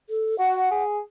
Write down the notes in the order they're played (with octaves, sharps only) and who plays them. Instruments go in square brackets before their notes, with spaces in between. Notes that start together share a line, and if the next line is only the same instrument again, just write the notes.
[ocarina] A4
[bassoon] F#4 [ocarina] F#5
[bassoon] G#4